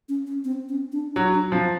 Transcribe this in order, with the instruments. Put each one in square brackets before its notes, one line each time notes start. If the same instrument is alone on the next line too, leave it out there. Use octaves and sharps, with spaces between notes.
[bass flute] C#4
C#4
C4
C#4
D4
[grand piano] F#3 [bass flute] D4
[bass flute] D4
[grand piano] F3 [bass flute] C4